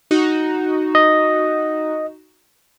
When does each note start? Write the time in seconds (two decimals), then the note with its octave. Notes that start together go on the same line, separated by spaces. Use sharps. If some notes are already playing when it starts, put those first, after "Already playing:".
0.11 D#4 F#4
0.95 D#5